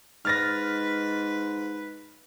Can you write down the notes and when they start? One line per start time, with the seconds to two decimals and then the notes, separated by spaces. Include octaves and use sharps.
0.25 G#2 B4 F6 A6 A#6